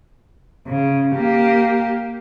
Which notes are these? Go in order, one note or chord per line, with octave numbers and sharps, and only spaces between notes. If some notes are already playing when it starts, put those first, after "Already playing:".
C#3
A#3 G4